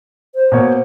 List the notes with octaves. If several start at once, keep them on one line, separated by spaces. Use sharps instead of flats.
C5
B2 A#3 C#5